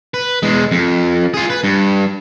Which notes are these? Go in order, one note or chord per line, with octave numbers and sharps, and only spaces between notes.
B4
E2 G#3
F2
F4 G#4
B4
G2